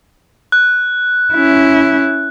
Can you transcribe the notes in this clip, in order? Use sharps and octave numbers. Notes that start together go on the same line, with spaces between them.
F#6
C#4 E4